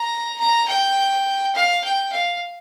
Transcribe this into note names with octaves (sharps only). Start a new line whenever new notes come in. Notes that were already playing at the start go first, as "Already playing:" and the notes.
Already playing: A#5
A#5
G5
F5
G5
F5